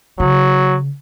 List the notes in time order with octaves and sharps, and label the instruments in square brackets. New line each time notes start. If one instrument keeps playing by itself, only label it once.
[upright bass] C#3 [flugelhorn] F#3